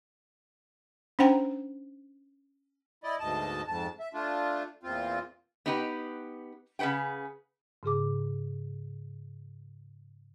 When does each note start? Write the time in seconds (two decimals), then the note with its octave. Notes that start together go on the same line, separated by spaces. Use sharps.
1.19 C#4 D4 C5 F#5 G5 A#5
3.04 E4 D5 D#5
3.20 D2 G#2 B2 D#5 A5
3.67 F2 G#2 A5
4.00 E5
4.14 A3 D4 F4
4.83 E2 A#2 C4 F4
5.66 B3 D#4 G4 B4
6.79 C#3 G#4 B4 F#5 G5
7.83 G#2 C#3 G#4 D6